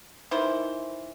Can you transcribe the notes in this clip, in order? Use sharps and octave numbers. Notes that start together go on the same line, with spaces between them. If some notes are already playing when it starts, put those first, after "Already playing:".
D#3 E3 C5